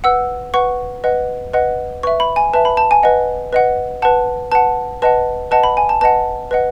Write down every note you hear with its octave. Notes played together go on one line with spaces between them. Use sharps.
B4 F#5 E6
B4 F#5 C#6
B4 D#5 F#5
B4 D#5 F#5
B4 E5 C#6
B5
G#5
B4 E5 A5
B5
A5
G#5
B4 D#5 F#5
B4 D#5 F#5
B4 F#5 A5
B4 F#5 A5
B4 D#5 F#5 A5
B4 D#5 F#5 A5
B5
G#5
A5
B4 D#5 F#5 A5
B4 D#5 F#5